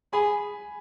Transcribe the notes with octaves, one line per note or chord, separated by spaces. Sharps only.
G#4 G#5 B5